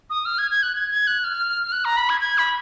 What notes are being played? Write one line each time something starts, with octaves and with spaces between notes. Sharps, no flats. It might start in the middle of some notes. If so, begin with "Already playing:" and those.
D#6
F6
G#6
G#6
F#6
G#6
G#6
F#6
F6
F6
F#6
A#5
B5
G#6
G#6
B5